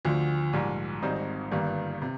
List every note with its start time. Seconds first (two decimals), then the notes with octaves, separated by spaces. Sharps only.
0.05 D2 D3 F3
0.53 A#1 G#2 G3
1.02 G#1 G#2 G3 C4 D#4
1.51 G1 G2 D#3 G3 A#3
2.02 C3